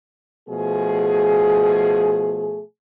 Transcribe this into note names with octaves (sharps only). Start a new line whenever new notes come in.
B2 F3 A3 G#4